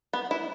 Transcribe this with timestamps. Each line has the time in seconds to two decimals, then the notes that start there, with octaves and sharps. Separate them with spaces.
0.13 B3
0.31 E4